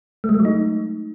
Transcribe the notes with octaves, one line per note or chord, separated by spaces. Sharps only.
A3
G#3
A3
F#3
D#4